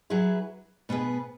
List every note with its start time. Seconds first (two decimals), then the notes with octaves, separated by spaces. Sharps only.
0.10 F#3 E4 G#4 B4
0.89 B2 B3 G#4 B4